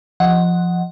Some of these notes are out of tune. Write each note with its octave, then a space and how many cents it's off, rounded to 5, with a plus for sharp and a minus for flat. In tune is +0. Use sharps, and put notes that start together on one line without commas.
F3 +0 D#5 +0 F#5 +0